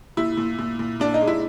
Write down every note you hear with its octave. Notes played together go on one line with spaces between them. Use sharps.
A#2 E4
A#2
A#2
A#2
A#2 D4
D#4
G#3
E4